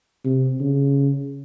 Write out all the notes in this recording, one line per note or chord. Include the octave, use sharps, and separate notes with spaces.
C3
C#3